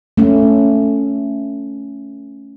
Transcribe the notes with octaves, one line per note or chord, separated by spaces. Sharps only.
A3 C#4